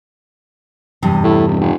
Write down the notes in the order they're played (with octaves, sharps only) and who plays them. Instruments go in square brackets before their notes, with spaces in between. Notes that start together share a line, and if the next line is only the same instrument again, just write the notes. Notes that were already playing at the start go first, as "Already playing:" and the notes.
[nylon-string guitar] E2 G2 C3
[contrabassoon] A2
D#1
F1